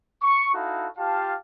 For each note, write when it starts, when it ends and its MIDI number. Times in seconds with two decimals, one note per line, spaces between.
0.22 0.51 85
0.54 0.88 63
0.54 0.88 64
0.54 0.88 66
0.54 0.88 69
0.54 0.88 77
0.97 1.35 65
0.97 1.35 67
0.97 1.35 77
0.97 1.35 81